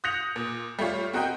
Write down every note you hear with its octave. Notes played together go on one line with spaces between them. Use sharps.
D#6 F#6 G6 A#6 C#7 F7
A#2
G3 A3 F4 C#5
C4 F#4 A#4 D#5 F#5 G5